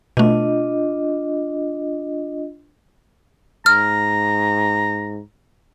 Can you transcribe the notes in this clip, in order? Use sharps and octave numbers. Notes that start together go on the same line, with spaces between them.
B2 A3 D4 F4 D#5
G#2 A#5 F6